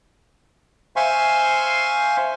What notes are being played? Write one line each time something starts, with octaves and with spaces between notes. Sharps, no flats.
C5 E5 F5 G#5 C6 C#6